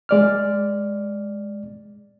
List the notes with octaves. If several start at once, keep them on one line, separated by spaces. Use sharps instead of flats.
G#3 D5 F6